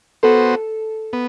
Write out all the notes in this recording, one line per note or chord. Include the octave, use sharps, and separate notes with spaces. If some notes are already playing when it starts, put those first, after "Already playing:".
B3 F#4 A4 C5
B3